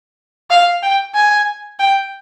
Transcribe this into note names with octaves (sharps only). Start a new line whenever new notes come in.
F5
G5
G#5
G5